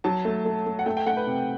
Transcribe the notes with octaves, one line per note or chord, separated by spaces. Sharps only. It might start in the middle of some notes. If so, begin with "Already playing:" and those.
F#3 A5
A3
A3
A3
F#5
A3 G5
G5
A3 F#5
B4
C3